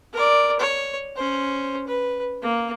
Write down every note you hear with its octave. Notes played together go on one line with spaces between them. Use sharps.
A#4 D5
C#5
C#4 C5
B4
A#3